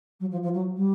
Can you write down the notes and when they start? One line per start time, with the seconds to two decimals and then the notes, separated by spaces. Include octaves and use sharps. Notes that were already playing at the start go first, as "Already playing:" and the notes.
0.20 F#3
0.30 F3
0.42 F3
0.53 F#3
0.76 G3